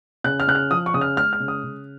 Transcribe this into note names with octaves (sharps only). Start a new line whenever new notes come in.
C#3 F#6
F6
C#3 F#6
F6
F3 D#6
C#6
C#3 D#6
F6
G#3 F6
F6
C#3
D#6
C#3